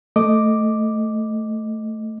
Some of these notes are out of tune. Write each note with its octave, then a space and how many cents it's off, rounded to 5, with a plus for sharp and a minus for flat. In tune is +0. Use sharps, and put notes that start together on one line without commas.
A3 +0 D#5 +0 D6 +0